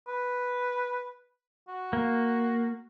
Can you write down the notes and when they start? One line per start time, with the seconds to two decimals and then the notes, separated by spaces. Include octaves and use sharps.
0.08 B4
1.68 F#4
1.93 A#3